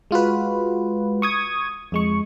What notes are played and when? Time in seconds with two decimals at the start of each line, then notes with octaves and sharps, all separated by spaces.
0.11 G#3 F4 F#4 B4
1.22 C#6 D#6 G#6
1.92 F2 G#3 C#6